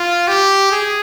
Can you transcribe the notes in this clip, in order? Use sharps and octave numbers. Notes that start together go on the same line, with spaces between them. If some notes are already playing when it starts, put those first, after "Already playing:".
Already playing: F4
G4
G#4